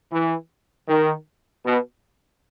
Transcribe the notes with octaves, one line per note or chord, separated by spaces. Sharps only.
E3
D#3
B2